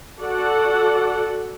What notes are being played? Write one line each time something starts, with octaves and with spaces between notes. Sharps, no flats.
F#4 A4 D5 F#5